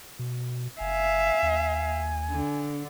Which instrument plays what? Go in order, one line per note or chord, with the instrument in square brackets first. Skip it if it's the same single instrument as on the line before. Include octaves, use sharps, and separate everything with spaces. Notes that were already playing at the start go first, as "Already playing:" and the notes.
[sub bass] B2
[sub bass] F#1 [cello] E5 F5 [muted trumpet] G#5
[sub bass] D#2
[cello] D3